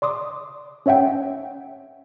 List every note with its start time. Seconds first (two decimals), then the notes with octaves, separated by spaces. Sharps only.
0.02 D5 C6 D6 D#6
0.86 C#4 C#5 E5 F#5 G5